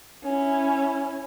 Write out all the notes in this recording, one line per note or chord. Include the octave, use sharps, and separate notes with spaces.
C#4 E4